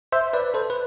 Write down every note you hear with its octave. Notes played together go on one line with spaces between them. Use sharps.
C5 E5
B4 D5
A4 C5
B4